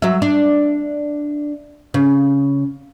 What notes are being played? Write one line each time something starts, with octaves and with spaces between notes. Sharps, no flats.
F#3 E5
D4
C#3